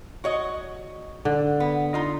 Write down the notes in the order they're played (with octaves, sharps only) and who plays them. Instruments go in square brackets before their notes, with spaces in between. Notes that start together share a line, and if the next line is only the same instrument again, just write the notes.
[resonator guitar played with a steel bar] F#4 C#5 D#5
[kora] D3
[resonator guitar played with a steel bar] B3
D#4 F4